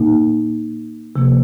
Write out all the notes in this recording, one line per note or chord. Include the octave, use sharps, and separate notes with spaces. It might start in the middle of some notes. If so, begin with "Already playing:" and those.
Already playing: A#2 A#3 D#4
C3 F3 A#3